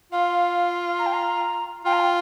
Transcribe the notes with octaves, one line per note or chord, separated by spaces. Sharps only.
F4 F5
A#5
G5
A#5
F4 G5
A#5
G5